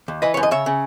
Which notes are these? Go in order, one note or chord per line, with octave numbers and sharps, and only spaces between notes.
D#2
E3 B4 D#5
F#2 C#5
D#5
C#3 C#5 E5
C#3